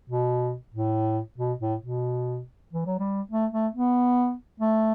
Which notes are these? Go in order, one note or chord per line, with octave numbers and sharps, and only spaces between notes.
B2
A2
B2
A2
B2
E3
F#3
G3
A3
A3
B3
A3